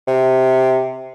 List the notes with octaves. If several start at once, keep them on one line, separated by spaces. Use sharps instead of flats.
C3